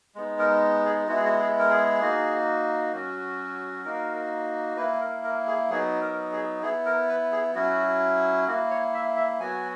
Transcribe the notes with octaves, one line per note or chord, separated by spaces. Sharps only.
G#3 B3 D#4
A#4
G#4
G#3 B3 E4 F#4
G#4
F#4
G#4
A#4
G#4
A#3 D#4 F#4
F#3 C#4 F#4
A#3 D#4 F#4 A#4
A#3 E4 B4
A#4
A#4
G#4
F#3 B3 D#4 G#4
A#4
G#4
B3 E4 G#4
A#4
B4
G#4
F#3 C#4 E4 F#4
A#3 E4 F#4
C#5
E5
E5
F#3 B3 F#4 G#5